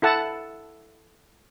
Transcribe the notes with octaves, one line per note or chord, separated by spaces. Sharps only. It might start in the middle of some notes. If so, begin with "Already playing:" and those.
E4 A4 F#5 A5